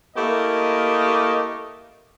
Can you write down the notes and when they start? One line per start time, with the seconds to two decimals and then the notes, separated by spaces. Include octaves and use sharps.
0.16 A3 A#3 E4 G4 D#5